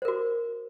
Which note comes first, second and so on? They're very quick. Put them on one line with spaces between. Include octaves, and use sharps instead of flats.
C5 A#4 F#4